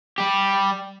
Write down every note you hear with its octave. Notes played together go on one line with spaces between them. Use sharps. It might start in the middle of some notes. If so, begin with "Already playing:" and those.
G3 G4